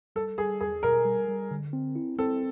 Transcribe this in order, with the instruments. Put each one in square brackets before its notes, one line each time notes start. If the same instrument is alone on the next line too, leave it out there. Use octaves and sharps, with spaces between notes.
[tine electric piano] G3 [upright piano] A4
[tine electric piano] G3 [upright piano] G#4
[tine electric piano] E2 [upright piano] G#4
[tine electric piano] B2 [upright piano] A#4
[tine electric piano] G3
G3
D3
C4
E4
[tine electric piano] C4 [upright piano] A4